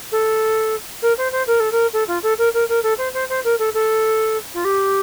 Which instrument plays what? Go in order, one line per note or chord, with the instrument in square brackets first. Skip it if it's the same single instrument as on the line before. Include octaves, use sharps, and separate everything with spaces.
[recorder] A4
A#4
C5
C5
A#4
A4
A#4
A4
F4
A4
A#4
A#4
A#4
A4
C5
C5
C5
A#4
A4
A4
F4
G4